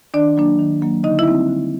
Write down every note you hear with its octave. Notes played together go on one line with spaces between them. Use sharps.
D#3 D4 D5
F#3 A#3 D4
D#3
F#3 A#3 D4
D3 D#4 D#5
E4 E5
G3 C4 D#4
D3